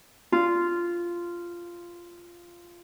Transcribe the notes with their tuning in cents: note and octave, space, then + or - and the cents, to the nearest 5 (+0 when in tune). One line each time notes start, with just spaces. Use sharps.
F4 -10